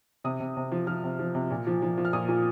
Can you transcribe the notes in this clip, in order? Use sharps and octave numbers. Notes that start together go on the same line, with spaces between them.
C3 D#6
C3
C3
F3
F3 F6
C3
F3
C3
A#2
F3
F3
F3
F6
A#2 D#6
A#2